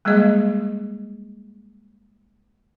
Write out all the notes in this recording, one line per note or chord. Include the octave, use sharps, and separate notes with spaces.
G3 G#3 A#3 G#4 D#5